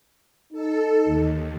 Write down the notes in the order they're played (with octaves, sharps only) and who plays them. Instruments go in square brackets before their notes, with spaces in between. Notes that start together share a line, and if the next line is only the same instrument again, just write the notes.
[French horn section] D#4 [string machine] A4
[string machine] D#2